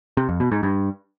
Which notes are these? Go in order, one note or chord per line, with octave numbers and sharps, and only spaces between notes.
C3
F2
B2
G#2
G2